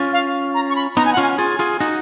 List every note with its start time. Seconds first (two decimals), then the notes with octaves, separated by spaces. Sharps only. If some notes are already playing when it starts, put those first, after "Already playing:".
Already playing: C#4 F4
0.13 F5
0.54 A#5
0.70 C#6
0.76 B5
0.97 B3 D#4 A#5
1.05 G#5
1.13 F#5
1.17 C#4 F4 G#5
1.38 F4 G#4 G#5
1.59 F4 G#4
1.80 D#4 F#4